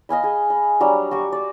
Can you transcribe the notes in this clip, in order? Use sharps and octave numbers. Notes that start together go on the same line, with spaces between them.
D#5 F5 G#5 B5
G#4
B5
F#3 G3 D4
F#4 G4 C#6
D5